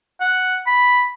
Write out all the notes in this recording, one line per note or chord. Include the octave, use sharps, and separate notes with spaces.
F#5
B5